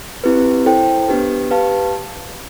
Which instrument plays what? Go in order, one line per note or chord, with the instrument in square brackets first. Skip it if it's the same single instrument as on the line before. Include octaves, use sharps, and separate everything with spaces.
[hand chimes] C4 E4 G4 B4
E4 A4 C5 G5
B3 D4 G4 B4
G4 B4 F5 A5